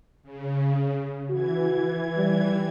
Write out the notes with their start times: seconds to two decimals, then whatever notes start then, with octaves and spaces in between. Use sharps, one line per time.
0.23 C#3
1.30 E3 F#4 G#6
2.17 G3